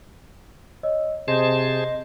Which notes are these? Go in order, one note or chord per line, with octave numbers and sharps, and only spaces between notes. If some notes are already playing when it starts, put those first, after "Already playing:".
C#5 D#5 E6
C3 G#4 C5 D#5 A5 C6 G6